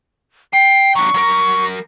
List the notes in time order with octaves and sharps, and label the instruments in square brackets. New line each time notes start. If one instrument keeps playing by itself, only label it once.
[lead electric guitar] G5 [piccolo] C7
[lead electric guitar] F#3 D4 [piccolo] C#6
[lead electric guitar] F#3 A#4